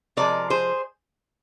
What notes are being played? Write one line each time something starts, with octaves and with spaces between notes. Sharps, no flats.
C3 F3 G#3 A#4 D5
G#4 C5